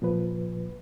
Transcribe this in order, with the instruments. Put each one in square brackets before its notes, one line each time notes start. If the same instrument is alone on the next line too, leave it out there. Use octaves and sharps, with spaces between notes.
[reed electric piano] A#2 F3 B4